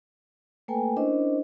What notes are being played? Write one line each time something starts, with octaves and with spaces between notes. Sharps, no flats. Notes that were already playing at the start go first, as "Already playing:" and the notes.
A3 A#3 A4 B4 G5 G#5
C#4 D4 E4 A#4 C5 D#5